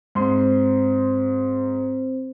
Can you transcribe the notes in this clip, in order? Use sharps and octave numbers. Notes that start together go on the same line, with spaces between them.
G#2 C4 C5 C6